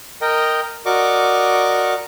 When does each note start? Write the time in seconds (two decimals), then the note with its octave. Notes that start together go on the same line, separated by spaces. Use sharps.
0.22 A#4 D#5 G5
0.86 F#4 A#4 D5 D#5 C#6 D6